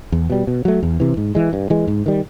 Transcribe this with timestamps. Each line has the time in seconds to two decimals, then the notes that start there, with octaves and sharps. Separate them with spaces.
0.12 E2
0.30 B2 G3
0.47 B2
0.65 F#3 A3
0.83 E2
1.00 C3 E3
1.17 G#2
1.35 E3 G#3
1.53 G2
1.70 E3 G#3
1.87 G#2
2.06 D#3 G3